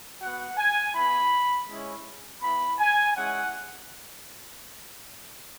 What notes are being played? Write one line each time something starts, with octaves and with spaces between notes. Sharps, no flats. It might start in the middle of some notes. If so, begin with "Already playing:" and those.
B3 F#4 F#5
G#5
B3 E4 B5
G#3 C#4 E4
B3 E4 B5
G#5
G#3 C#4 E4 F#5